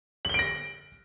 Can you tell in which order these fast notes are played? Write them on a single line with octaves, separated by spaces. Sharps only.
F#7 G7 D7 A#6